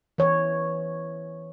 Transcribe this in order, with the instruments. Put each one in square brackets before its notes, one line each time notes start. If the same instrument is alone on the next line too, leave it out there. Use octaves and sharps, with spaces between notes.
[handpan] E3 C#5